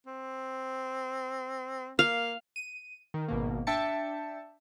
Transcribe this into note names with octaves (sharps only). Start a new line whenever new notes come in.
C4
A#3 F5
D#7
D#3
G#1 B2 A#3
D4 E5 G5 A5 A6 C#7